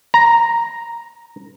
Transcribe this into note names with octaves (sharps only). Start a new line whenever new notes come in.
A#5